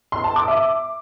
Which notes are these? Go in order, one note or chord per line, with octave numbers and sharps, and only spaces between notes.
C6
A5
D6
E5